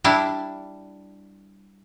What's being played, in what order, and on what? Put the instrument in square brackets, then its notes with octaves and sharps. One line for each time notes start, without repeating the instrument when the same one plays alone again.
[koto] G3 D4 E4